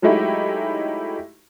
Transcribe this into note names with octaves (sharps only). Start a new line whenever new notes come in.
F#3 G#3 A3 D#4 E4 G4